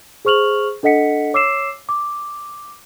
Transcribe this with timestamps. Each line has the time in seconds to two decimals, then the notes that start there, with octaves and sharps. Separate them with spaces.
0.25 G#4 C5 C#6 F6 F7 F#7
0.83 D4 A4 D#5 F#5 B6 C#7
1.34 C#5 D6 E6 C7 E7
1.89 D6